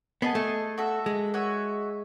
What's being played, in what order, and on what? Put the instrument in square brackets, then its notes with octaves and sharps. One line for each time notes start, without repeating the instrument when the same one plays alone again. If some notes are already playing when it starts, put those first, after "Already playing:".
[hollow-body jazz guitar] B3 [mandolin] G#4 D#5 A5
[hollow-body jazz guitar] A3
[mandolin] F#4 A4 E5
[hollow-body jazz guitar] G#3
[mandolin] F#4 C#5 E5 G#5